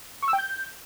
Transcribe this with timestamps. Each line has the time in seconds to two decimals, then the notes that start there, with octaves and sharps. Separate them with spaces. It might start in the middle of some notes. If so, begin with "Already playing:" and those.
0.22 C#6
0.28 E6
0.33 G5
0.38 G6